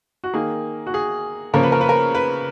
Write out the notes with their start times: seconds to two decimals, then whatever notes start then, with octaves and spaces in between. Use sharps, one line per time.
0.24 F#4
0.34 D#3 A#3 G#4
0.86 F#4
0.94 G#4
1.54 C#3 F3 A#3 A#4
1.63 B4
1.72 A#4
1.81 B4
1.89 A#4
2.15 B4